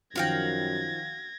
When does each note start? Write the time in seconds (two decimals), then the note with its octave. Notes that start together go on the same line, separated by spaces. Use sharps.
0.16 F#2 D#3 F3 F#4 F5 G5 G#6 A#6